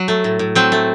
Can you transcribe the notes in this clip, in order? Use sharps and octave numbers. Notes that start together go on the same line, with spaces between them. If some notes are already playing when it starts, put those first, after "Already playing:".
Already playing: F#3
A3
A2
A2
F#3 C4
A3